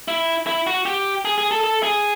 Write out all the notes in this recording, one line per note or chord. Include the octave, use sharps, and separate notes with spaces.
E4
E4
F#4
G4
G#4
G#4
A4
A4
G#4